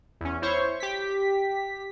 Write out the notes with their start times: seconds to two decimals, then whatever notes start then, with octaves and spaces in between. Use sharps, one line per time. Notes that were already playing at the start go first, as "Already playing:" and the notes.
0.21 E2 C#4
0.42 E4 C5 C#5 C#6
0.80 G4 B6